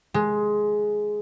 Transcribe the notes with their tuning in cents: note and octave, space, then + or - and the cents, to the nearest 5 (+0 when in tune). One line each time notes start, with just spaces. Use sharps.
G#3 +10